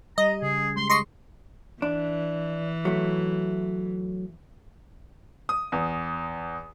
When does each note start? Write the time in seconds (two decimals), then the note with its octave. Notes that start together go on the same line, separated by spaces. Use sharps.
0.18 G3 D#5 A#5
0.42 C#3 G#4
0.76 G#3 C6
0.90 D#5 C6 C#6 C7
1.82 E3 D4
2.85 F#3 A3
5.49 D#6
5.72 E2